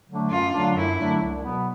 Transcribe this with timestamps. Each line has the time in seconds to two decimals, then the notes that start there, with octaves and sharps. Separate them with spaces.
0.08 D3 F#3 A3 D4
0.31 F#2 F4
0.53 D3 F#3 A3 D4
0.76 F#2 E4
0.99 D3 F#3 A3 D4
1.21 C2
1.44 B2 F#3 B3